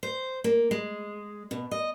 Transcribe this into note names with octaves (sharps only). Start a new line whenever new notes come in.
C5
A#3
G#3
B2
D#5